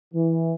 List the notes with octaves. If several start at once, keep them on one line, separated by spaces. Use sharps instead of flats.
E3